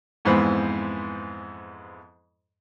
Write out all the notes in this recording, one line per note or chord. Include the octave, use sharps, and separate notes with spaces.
F2 G#2 E3 B3 C5 B5